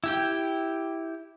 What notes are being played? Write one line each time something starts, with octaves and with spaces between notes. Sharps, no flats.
E4 G4 G5